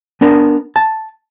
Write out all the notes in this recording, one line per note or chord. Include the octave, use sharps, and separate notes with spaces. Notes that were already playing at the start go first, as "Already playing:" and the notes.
B3 D4 A#4
A5